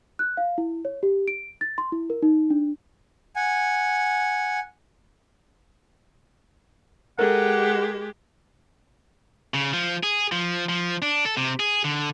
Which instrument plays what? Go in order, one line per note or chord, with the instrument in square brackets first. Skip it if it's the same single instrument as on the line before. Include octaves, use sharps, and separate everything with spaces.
[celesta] F#6
F5
E4
C#5
G4
D7
A6
C6
E4
A#4
D#4
D4
[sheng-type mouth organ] F#5 G#5
[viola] G#3 G4 [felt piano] A4 A#4 [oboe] F#5
[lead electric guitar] C#3
F3
G#4
F3
F3
D4
A4
C3
G#4
D3